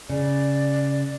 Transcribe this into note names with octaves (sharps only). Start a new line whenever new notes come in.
C#3 D5